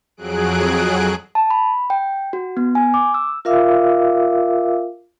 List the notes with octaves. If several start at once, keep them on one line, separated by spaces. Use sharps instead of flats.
F2 F#3 G#4 F#6 D7
A5
B5
G5
F#4
B3
G#5
D6
E6
F4 A#4 E5 F5 D6 E6